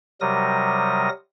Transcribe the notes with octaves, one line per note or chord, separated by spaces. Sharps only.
C3 F#3 G3 A#4 D#6 A#6